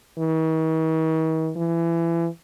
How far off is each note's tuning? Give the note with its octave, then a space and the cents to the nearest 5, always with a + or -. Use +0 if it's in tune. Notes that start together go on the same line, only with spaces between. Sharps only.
D#3 +45
E3 +25